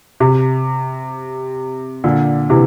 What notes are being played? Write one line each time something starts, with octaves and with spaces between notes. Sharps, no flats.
C3
A#2 D3
C3 E3